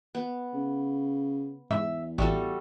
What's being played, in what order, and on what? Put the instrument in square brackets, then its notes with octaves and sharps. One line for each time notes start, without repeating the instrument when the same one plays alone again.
[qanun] B3
[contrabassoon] C#3
[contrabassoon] E2 [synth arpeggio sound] G#2 [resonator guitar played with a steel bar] E5
[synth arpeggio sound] A1 [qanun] G3 F#4 A4 [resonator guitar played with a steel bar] A3